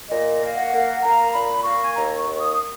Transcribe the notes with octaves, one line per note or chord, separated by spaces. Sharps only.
A#2 D#5
A#3
F#5
A#3
A#3 A#5
A#2 B5
A#3 C#6
G#5
D#2 A#5
C#6
D#2
D#6